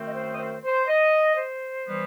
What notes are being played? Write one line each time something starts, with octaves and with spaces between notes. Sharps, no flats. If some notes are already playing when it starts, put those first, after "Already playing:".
Already playing: F#2 D#3 A3 C4
D#5
C5
D#5
C5
C5
D#5
C5
E3 G3 B3